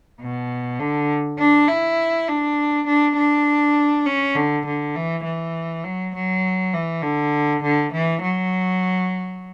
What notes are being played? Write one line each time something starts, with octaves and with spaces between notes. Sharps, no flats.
B2
D3
D4
E4
D4
D4
D4
C#4
D3
D3
E3
E3
F#3
F#3
E3
D3
D3
E3
F#3